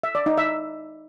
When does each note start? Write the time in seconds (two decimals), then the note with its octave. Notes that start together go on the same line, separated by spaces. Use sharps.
0.03 E5
0.15 D5
0.26 D#4
0.38 E5